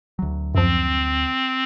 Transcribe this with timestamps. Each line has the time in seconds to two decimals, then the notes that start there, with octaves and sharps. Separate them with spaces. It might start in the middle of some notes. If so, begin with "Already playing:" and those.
0.19 D2 F#3
0.55 F#2 F3 C4